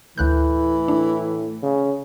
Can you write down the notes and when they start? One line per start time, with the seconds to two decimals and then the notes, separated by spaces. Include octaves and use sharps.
0.18 D2 A2 E3 F#6 G6
0.88 A2 D4
1.63 C#3